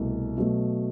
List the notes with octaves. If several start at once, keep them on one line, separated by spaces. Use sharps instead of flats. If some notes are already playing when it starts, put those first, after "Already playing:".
Already playing: C2 B2 A3
B2 F#3 A3